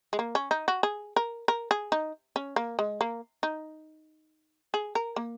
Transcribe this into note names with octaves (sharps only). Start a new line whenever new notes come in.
G#3
A#3
C#4
D#4
F#4
G#4
A#4
A#4
G#4
D#4
C#4
A#3
G#3
A#3
D#4
G#4
A#4
A#3